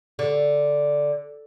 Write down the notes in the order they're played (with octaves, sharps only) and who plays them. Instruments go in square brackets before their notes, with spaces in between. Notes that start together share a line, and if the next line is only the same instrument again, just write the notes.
[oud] D3